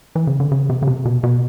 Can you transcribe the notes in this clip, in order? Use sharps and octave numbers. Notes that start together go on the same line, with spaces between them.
E3
C#3
D3
C#3
C3
C#3
C3
B2
B2